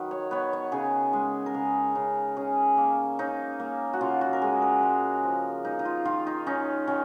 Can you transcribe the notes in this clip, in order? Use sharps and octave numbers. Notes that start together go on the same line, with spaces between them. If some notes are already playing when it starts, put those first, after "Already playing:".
Already playing: D#3 F#3 B4
C#5
B3 C#5
C#5
C#3 G#4
G#3
A#4
C#3 G#4
C#3
C#4 G#4
A#3
C#4 D#4
A#3
F#4
C#3 F4
F#4
A#4
G#3 G#4
A#4
G#3
F3
A#3 D#4
D#4
F4
D#3 F4
D#4
C#4 D#4
D#3 C#4